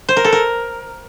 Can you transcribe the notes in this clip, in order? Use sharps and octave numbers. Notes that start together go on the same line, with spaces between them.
C5
A#4
A4
A#4